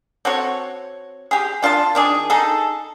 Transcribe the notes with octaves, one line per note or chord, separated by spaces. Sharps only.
C4 F#4 A4 C#5
G4 G#4
D4 F4 D#5 A5
D#3 D4 G#4
D#4 G#4 A4